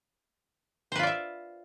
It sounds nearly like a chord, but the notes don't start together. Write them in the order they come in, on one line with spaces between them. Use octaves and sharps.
C5 B4 F4 D5 E5